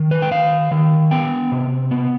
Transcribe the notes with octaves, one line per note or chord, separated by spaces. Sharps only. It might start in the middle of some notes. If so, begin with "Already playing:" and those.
Already playing: D#3
B4
G5
D#3 F5
D#3
B3 G5
C3
B3